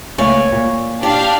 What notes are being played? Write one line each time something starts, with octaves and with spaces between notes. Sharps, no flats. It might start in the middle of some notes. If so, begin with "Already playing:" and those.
C#2 A3 A#3 C#5 D5 G#5
A#2
D4 G4 F5